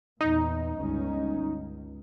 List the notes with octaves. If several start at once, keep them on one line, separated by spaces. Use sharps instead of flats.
E2 A#2 D#4
G1 C#2 C#4
C#2